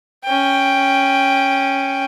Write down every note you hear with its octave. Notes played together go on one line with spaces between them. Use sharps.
C#4 G5